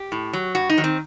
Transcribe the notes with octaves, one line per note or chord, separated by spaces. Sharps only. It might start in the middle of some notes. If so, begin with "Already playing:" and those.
Already playing: G4
A2
F#3
G2 F#4
D#4
D#3 F#3
C4